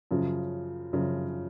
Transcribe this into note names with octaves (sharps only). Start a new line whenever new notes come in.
F#2 C#3 F3
F#2 C#3 F3